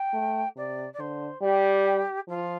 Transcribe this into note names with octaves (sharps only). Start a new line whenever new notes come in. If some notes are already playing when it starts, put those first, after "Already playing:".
Already playing: G5
A3
C3 D5
D5
D3 C5
G3 G4
F3 F4